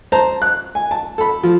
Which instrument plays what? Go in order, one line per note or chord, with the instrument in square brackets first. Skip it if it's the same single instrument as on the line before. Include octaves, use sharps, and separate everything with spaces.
[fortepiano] C5 A5 A#5
F#6
G#5
A5
A4 B5
F3